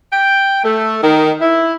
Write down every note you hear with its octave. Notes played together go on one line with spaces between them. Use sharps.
G5
A3
D#3
E4